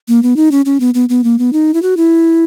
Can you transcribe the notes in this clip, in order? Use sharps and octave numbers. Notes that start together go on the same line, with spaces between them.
A#3
B3
D#4
C#4
C#4
B3
B3
B3
A#3
B3
D#4
E4
F#4
E4